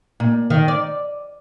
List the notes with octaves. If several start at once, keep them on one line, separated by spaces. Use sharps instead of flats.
A#2
D#3
D5